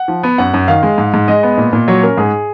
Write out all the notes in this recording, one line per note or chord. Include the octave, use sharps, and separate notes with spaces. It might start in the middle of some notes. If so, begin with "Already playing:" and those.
Already playing: F#5
F3
B3
F#2 F#5
F#2
D#3 F5
G#3
G#2
G#2
G#3 D#5
B3
A#2
A#2
F#3 C#5
C#4 A#4
G#2 G#4